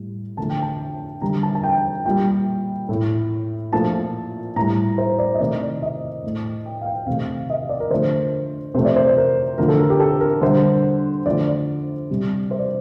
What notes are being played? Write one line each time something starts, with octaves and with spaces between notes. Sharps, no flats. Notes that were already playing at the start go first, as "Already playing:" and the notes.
Already playing: A2 G3
D3 F3 A3 A5
G5
A5
D3 G3 A#5
A5
A5
G5
A#2 G3 G5
A2 A3
A#2 F3 A3 A5
A2 G3 A#5
C5
D5
D#5
C3 D#3 A3 D5
D#5
A2 A3
G5
F5
G5
C3 D#3 A3 F5
D#5
D5
A#4
D3 F3 A3 C5
C3 F3 A3 C5
D5
C5
A#4
D3 F3 A3 A#4
A4
A#4
G4
A4
A#4
D3 G3 C5
D3 F3 A3 D5
C3 G3
C5
D5